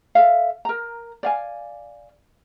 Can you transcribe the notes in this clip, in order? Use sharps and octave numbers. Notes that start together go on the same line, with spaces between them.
A4 E5 F5
A#4 A#5
D5 F5 G#5